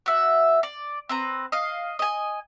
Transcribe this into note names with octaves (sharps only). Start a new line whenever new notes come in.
F#4 E5
D5
C4 B4 A#5
D#5 F5
D#5 G#5